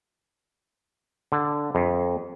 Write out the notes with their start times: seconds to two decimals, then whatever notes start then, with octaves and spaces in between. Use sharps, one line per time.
1.32 D3
1.75 F2